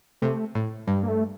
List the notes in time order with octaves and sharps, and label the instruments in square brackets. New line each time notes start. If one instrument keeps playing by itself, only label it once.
[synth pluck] C3 [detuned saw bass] A3
[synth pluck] A2
[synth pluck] G2 [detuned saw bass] G3
[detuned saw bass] A#3
A3